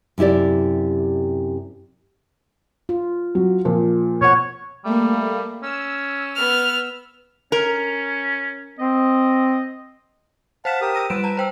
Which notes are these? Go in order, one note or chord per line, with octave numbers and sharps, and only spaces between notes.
F#2 C3 E4 G4 D5
F4
F#3
A#2 F3
B2 C5 C#5 F#5
G3 A3 A#3
C#4 E6
B3 F6
C#4 A#4
C4 D#5
C5 F5 F#5 A5 B6 E7
G4 A#4 D#6
E6 A#6 D#7
G3 B4 D7 E7
A5 A#5
C5 G5 E6